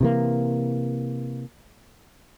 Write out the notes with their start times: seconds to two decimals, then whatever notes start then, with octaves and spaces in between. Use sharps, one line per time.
0.01 C3 E3 A#3